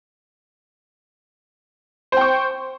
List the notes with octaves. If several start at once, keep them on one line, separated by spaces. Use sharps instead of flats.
C5 G5 C#6